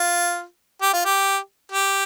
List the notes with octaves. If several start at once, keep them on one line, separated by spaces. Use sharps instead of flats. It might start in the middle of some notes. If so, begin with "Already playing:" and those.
Already playing: F4
G4
F4
G4
G4